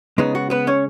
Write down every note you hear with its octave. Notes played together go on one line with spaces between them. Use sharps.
C#3 G#3 B3 D#4
F#4
B3 B4
C#4 C#5